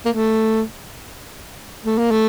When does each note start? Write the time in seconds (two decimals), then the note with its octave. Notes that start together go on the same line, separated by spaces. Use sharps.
0.05 A#3
0.09 A3
1.85 A3
1.98 A#3
2.11 A3